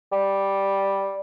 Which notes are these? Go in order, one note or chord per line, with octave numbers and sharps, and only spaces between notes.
G3